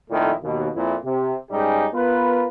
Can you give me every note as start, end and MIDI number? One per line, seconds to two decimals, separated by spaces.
0.10 0.31 41
0.10 0.31 46
0.10 0.31 51
0.10 0.31 53
0.10 0.31 57
0.10 0.31 64
0.43 0.68 39
0.43 0.68 47
0.74 0.95 41
0.74 0.95 46
0.74 0.95 64
1.05 1.35 48
1.51 1.86 44
1.51 1.86 55
1.51 1.86 61
1.51 1.86 63
1.51 1.86 67
1.51 1.86 68
1.94 2.47 59
1.94 2.47 65
1.94 2.47 70
1.94 2.47 71